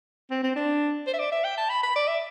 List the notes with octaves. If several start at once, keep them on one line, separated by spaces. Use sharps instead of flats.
C4
C4
D4
C5
E5
D5
E5
G5
A5
B5
B5
D5
E5